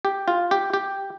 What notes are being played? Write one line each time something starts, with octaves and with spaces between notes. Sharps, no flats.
G4
F4
G4
G4